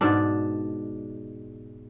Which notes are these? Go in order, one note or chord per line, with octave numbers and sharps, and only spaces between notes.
G#2 B2 D4